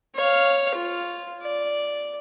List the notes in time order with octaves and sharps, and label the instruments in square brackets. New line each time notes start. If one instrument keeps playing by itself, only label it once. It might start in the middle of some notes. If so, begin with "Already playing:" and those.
[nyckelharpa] C#5 F5
F4
D5